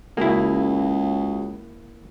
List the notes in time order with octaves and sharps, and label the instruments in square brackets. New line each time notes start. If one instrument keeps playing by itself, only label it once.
[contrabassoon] C#2 [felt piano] C#3 F#4 G#4 [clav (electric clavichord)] A#3 E4